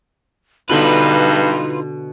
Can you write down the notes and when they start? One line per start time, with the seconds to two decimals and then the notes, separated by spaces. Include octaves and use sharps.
0.70 G2 B2 D3 D#4 F4 B4 C6